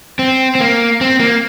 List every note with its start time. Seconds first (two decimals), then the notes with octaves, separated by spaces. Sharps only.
0.19 C4
0.55 C4
0.61 A#3
1.01 C4
1.20 A#3